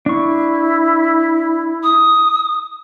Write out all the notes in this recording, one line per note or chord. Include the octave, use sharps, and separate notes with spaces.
D4 E4 C#6
D#6